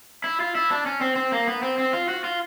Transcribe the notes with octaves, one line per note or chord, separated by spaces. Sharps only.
E4
F4
E4
D4
C#4
C4
C4
A#3
B3
C4
C4
F4
F#4
F4